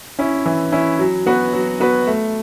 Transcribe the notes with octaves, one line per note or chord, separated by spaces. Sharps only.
C#4 E4
E3
C#4 E4
F#3
B3 F#4 B4
F#3
B3 F#4 B4
A3